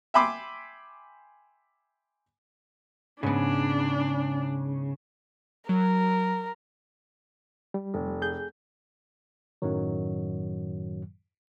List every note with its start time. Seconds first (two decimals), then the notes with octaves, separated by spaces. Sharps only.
0.14 E5 G5 G#5 B5 C6 D6
3.23 G#2 C#3 B3 D4
5.69 F#3 A#4
7.74 G3
7.94 F1
8.22 G#4 G6
9.62 F#2 A2 D#3 F#3